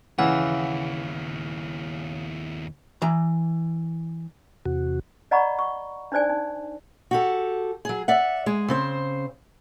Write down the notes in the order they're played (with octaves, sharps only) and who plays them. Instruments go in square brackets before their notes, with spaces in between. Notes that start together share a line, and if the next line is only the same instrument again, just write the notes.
[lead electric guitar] D#2 E4 [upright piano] C#3 [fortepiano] E3 [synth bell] F#5
[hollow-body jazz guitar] E3 A#5
[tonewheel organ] E2 C3 F#4
[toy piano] D5 D#5 F#5 A#5 B5 C#6
C#6
D4 D#4 C5 D5 G#5
D#4
[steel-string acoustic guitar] F#4 G4 A4
F#3 G#4
D5 E5 F#5
G#3 G#4
C#3 C4 C5